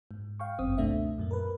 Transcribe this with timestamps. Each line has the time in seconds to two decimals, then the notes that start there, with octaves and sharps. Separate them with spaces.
0.11 G#2
0.40 F5 G5 C#6
0.59 G1 F#2 C4 D#6
0.78 C#2 B2 A3 D4 E5
1.18 F#2 A#2 A#3
1.31 A#4 B4